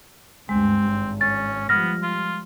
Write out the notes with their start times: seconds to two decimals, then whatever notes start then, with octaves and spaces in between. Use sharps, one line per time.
0.49 D2 G2 G#3 C4
0.84 G#1
1.21 C#4 A6
1.69 F3 G3 B3 F6 A#6
2.03 F4